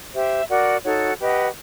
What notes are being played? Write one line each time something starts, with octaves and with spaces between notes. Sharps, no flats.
G4 C5 E5
F#4 A#4 D5 F#5
D#4 F#4 A4 C#5
G4 B4 D#5 F#5